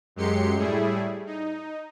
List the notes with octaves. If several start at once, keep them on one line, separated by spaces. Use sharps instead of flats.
F#2 F#3 G#3 G4 C6 C#7
A2 G3 A3 E4 G#4
D#4